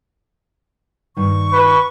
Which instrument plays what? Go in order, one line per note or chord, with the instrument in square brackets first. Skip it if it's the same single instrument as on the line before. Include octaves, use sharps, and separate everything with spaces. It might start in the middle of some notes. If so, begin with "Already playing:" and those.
[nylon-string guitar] G2 D#3 [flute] C#6
[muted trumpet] B4